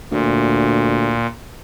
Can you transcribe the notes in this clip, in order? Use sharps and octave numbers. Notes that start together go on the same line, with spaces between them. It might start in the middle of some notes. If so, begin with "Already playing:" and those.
D2 A#2